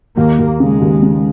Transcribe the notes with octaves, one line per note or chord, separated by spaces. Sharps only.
D#2 A#3
D#2
C#3 G#3
D#2
C#3